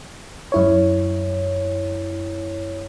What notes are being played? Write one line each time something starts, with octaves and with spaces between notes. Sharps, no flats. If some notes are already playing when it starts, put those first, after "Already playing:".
F#2 E4 C#5